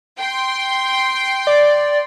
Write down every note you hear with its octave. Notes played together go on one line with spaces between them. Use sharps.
G5 C6
D5